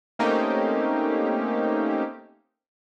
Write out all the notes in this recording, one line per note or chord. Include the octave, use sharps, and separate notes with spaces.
A3 A#3 C4 C#4 D#4 G4